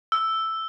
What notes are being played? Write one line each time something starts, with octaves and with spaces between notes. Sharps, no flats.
E6